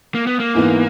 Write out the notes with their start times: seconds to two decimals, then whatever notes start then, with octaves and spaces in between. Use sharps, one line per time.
0.15 A#3
0.27 B3
0.40 A#3
0.54 G#2 E3 B3